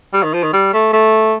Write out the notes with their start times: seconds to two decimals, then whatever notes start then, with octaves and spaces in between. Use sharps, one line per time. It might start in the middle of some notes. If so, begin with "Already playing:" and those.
0.13 G3
0.23 D#3
0.33 F3
0.43 D#3
0.53 G3
0.73 A3
0.93 A3